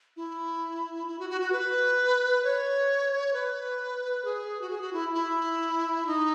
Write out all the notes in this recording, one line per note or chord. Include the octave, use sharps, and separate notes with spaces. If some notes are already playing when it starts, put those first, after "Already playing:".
E4
E4
F#4
F#4
F#4
B4
C#5
B4
G#4
F#4
G#4
F#4
E4
E4
D#4